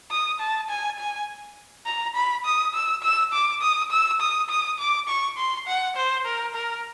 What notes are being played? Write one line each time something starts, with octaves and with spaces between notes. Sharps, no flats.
D#6
A5
G#5
G#5
A#5
B5
D#6
E6
E6
D6
D#6
E6
D#6
D#6
D6
C#6
C6
F#5
C5
A#4
A#4